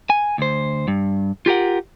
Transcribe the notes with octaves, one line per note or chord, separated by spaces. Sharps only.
G#5
D2 C5
G2
F4 G4 A#4 F#5